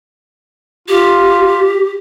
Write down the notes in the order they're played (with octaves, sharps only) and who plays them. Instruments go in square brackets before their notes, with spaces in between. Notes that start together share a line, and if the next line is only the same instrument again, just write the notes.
[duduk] F4 [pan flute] G4